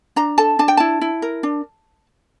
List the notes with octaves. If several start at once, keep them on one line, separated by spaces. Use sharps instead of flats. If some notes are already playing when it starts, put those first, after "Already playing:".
D4 A#5
A4 A5
D4 A5
G5
E4 A5
E4
A#4
D4